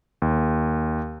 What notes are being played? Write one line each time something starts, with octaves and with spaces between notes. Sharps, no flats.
D#2